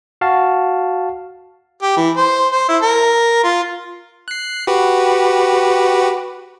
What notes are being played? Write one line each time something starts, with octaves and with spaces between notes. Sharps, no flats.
F#4 F5 A5
G4
E3
C5
C5
E4
A#4
F4
F#6 C7
F#4 G4 B4